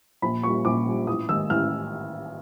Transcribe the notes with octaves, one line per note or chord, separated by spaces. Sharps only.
A#1 B5
A#2 G3 C#6
A#1 D6
A#2 G3
A1 D#6
G#2 D#3 E6
A1 F6